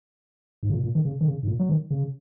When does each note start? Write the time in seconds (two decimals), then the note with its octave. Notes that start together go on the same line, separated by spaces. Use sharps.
0.63 G#2
0.70 C#3
0.73 A#2
0.83 A#2
0.95 D#3
1.05 C#3
1.21 D#3
1.27 C#3
1.43 G#2
1.47 A#2
1.59 F#3
1.69 D#3
1.91 C#3